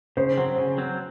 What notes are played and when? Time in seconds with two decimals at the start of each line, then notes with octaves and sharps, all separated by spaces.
0.17 C#3 C5
0.37 F#3 C4
0.58 C#3
0.78 F#3 C4